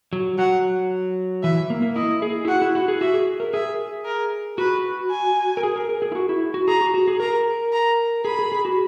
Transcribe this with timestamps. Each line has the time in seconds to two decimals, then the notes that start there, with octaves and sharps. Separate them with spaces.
0.13 F#3
0.38 F#3 F#5
1.43 E3 E5
1.70 A#3
1.82 A#3
1.96 E4 D#5
2.22 G#4
2.45 E4
2.48 F#4 F#5
2.62 E4
2.75 F#4
2.88 G#4
3.01 F#4 E5
3.14 G#4
3.40 A#4
3.53 G#4 E5
4.05 A#4
4.58 F#4 B4
5.11 G#5
5.57 A#4
5.63 G#4
5.76 A#4
5.89 A#4
6.02 G#4
6.12 E4
6.15 F#4
6.29 E4
6.54 F#4
6.68 G#4 A#5
6.81 F#4
6.94 F#4
7.07 G#4
7.20 A#4 A#5
7.73 A#5
8.25 G#4 B5
8.39 G#4
8.52 G#4
8.65 F#4